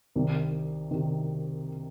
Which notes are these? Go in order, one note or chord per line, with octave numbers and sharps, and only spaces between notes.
C2 C3 D#3
C3 D#3